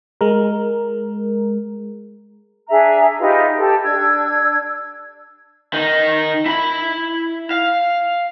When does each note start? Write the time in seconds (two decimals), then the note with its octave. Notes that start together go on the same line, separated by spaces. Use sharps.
0.21 G#3 A#4
2.69 D4 G#4 E5 A#5
3.20 D#4 F4 G4 B4
3.58 G4 A4
3.84 D4 E6 G#6
5.74 D#3 D#4
6.46 E4 B5
7.51 F5